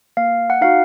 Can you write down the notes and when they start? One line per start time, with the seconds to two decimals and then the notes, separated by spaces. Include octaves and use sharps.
0.17 A#3 F5
0.50 F#5
0.61 D#4 F#4 F5